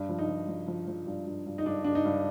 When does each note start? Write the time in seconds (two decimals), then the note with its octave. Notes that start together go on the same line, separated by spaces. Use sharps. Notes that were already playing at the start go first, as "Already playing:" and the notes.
Already playing: G2
0.09 F3
0.18 D#4
0.28 F3
0.48 F3
0.68 F3
0.88 F3
1.07 G2
1.26 G2
1.46 G2
1.58 D#4
1.65 G2 D4
1.84 G2 D4
1.95 D#4
2.05 G2